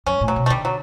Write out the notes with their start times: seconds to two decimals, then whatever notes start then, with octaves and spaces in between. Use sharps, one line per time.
0.06 F#2 C#4
0.21 A2
0.28 F#3
0.36 B2
0.46 A3
0.50 D3 G3
0.65 F#3